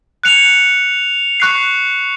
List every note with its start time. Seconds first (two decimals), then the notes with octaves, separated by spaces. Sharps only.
0.24 F#6 C#7 F7
1.40 C#6 F#6 C7